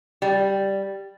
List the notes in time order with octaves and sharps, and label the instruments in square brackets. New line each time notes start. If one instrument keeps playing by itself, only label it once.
[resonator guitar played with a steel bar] G3